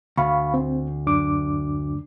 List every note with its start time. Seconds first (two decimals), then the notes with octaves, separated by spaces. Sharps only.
0.17 D2 F5 B5 C#6
0.54 C4
1.06 F#2 D4 D6